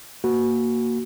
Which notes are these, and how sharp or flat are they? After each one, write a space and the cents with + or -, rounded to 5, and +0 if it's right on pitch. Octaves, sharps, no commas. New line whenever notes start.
A#3 +0 F#4 +0